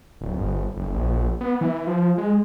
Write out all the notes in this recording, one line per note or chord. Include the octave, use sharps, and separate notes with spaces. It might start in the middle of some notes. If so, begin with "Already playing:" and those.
D1
G1
F#1
A#1
B3
E3
F3
G#3